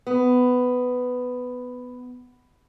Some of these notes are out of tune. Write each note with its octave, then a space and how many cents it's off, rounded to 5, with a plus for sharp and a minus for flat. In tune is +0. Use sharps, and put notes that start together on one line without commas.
B3 +10